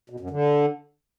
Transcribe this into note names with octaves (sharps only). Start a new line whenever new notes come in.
B2
F#2
D3